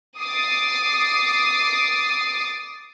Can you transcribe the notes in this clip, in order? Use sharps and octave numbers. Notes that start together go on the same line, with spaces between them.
D6 D#6 A6 C7